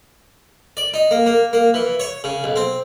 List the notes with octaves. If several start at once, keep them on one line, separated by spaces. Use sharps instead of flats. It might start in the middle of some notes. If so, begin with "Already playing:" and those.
D5
D#4
A#3
A#3
A#3
E3
C#5
C#3
B1
C4